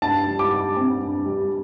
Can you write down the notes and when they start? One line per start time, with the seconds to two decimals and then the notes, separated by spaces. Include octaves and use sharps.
0.02 G2 A5
0.26 G3
0.39 D6
0.51 G3
0.76 C4
1.01 G2
1.25 G3